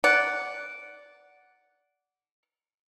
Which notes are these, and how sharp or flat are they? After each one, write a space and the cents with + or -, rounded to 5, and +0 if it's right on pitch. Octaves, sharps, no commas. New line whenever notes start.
D5 -15 F#5 +0